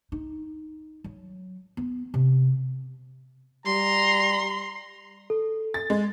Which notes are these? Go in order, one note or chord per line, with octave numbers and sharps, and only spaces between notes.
D#4
F#3
B3
C3
G3 A#5 C6
A4
A6
G#3